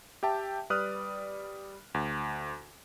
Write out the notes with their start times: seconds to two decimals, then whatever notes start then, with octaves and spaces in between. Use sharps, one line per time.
0.23 G4 E5 G5 A5
0.70 G3 B4 D5 D#6 F6 F#6
1.94 D2